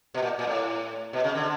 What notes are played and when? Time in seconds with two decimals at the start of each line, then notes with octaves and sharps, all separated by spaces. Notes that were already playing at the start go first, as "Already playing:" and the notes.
0.14 B2
0.22 A#2
0.39 A#2
0.47 A2
1.13 B2
1.24 C#3
1.35 D3